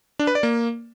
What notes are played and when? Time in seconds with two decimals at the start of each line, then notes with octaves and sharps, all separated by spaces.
0.19 D4
0.27 B4
0.35 D5
0.43 A#3